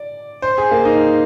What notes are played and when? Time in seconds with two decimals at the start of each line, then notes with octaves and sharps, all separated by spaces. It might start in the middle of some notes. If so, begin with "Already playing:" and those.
Already playing: D5
0.42 C5
0.58 G#4
0.71 A#3
0.85 D#4